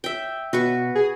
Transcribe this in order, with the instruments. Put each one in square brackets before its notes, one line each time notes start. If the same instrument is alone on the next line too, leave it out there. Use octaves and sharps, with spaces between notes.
[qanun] E5 G5
[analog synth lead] B2 [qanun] F#4 B4 C#6
[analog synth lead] G#4